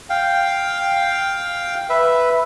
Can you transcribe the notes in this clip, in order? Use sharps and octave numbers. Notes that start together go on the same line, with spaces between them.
F5 G5
B4 E5